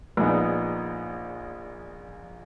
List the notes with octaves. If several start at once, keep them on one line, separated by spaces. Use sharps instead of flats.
A#1 A#2 G#3 B3 D#4